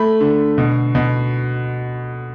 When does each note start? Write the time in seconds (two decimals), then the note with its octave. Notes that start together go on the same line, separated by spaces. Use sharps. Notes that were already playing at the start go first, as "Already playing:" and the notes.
Already playing: A3 B5
0.20 D3
0.58 B2
0.95 B2